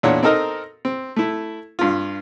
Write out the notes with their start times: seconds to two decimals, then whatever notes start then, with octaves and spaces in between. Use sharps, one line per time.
0.03 E2 A#2 D4 E4 C#5
0.23 C4 D#4 A4 A#4 D#5
0.85 C4
1.16 A3 E4
1.79 G2 F4